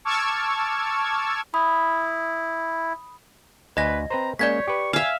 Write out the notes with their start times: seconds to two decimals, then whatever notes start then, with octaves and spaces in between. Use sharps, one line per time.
0.05 A5 C#6 D6 E6 F6 G#6
1.54 E4 B5 D#6
3.77 D2 B4 D#5 G#5 A#6
4.11 C4 B4 C5 A#5
4.39 G#3 A#3 C#4 C#5 D5 G#6 B6
4.68 G4 B4 C#6
4.93 E5 F5 G#5